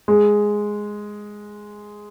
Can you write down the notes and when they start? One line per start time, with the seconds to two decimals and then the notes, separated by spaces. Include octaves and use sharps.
0.08 G#3